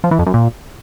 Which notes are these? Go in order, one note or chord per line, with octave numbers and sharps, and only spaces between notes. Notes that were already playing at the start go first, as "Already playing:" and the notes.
F3
E3
F2
F#2
A#2